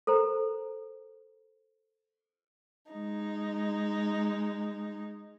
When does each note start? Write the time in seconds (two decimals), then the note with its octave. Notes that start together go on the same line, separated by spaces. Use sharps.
0.07 A4 A#4 C5 A#5
2.91 G#3 D#4